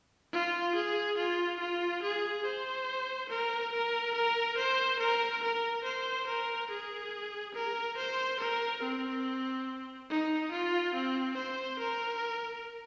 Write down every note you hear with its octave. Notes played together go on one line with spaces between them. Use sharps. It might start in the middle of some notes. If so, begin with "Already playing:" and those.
F4
G#4
F4
F4
G#4
C5
A#4
A#4
A#4
C5
A#4
A#4
C5
A#4
G#4
A#4
C5
A#4
C4
D#4
F4
C4
C5
A#4